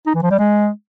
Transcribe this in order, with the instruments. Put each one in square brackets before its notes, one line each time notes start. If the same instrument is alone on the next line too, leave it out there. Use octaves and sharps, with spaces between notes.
[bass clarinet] D#4
E3
F3
G3
G#3